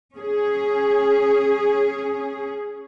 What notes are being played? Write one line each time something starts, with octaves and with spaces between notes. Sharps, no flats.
C#4 G#4